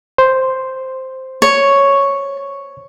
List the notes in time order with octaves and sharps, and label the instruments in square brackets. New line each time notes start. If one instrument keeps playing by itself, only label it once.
[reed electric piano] C5
[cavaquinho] C#5